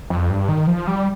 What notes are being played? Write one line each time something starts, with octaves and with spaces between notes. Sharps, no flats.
F2
G2
D#3
F3
G3